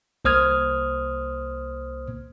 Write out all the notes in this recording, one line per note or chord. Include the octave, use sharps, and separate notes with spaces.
C2 A#3 C5 D#6 F6 G#6